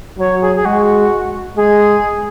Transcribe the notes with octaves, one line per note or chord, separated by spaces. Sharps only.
F#3 C#5
G#4
G#4
G#3 F#4
G#3 G#4